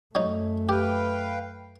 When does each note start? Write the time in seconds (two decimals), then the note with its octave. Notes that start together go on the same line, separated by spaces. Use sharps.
0.15 F#2 F#3 A3 D#4
0.69 G4 B4 F5 G5